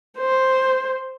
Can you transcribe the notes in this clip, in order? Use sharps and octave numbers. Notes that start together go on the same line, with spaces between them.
C5